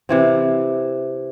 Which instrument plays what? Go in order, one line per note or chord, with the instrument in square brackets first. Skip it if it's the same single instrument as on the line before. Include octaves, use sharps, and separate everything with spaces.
[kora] C3 E3 C4